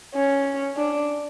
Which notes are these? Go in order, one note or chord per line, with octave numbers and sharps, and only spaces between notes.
C#4
D4